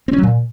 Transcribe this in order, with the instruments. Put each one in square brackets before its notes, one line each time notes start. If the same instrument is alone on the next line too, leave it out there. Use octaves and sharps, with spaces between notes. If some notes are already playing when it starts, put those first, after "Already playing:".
[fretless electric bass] C4
C#4
F#3
A#2